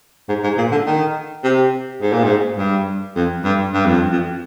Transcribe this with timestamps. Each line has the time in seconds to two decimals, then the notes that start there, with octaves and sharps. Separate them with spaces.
0.29 G#2
0.44 G#2
0.58 A#2
0.72 D3
0.86 D#3
1.44 C3
2.02 G#2
2.13 A#2
2.24 G#2
2.58 G2
3.16 F2
3.44 G2
3.74 G2
3.86 F2
4.12 F2